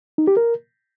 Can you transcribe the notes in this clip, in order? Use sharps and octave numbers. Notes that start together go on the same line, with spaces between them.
D#4
G4
A#4